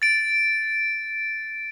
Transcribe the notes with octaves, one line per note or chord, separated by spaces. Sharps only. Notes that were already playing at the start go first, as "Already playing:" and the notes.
A6 D7